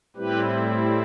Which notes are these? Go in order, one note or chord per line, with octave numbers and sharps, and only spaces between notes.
A2 G3 C4 E4 G4 B4